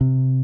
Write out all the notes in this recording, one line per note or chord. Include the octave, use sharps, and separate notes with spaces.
C3